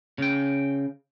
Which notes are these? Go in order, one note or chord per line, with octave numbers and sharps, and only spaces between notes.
C#3 G5